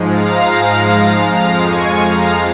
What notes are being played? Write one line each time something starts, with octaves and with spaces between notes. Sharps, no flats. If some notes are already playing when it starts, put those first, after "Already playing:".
Already playing: G#2 F3 G#3
F5 A#5
F2 F3 G#3 F5 A#5
G#5 C#6
F5 A#5